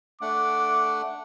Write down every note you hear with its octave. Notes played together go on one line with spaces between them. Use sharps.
A3 D4 F#5 D6